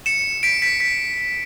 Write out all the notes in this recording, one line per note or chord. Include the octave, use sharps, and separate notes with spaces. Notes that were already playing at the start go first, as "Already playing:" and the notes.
C#7 E7
B6 D7
B6 D7
B6